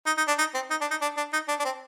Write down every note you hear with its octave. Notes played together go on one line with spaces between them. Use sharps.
D#4
D#4
D4
D#4
C4
D#4
D4
D#4
D4
D4
D#4
D4
D4
C4